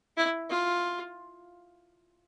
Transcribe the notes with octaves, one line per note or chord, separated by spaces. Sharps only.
E4
F4